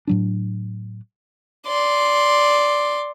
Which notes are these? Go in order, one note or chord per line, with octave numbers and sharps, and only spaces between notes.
A2 F#3 D4
D5 C6